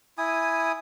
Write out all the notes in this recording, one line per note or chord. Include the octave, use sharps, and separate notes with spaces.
E4 G#5 D#6